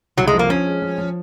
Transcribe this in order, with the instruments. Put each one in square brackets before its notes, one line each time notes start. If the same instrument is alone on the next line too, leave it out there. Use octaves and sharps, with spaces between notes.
[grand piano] C2 [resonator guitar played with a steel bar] F#3
[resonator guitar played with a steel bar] G#3
[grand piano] F3
[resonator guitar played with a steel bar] A#3
[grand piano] F3 [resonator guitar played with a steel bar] C#4
[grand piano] G#3
F3
F3